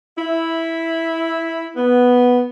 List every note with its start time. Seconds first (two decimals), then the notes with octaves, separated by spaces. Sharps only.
0.18 E4
1.77 B3